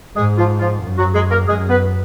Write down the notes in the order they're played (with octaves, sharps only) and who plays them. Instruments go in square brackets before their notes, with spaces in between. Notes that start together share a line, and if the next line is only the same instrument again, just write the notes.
[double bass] G#2 [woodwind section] G#3 G#4
[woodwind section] F3 F4
F3 F4
[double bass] F#2
[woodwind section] F#3 F#4
G#3 G#4
A#3 A#4
[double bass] F#2 [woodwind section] G#3 G#4
[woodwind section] B3 B4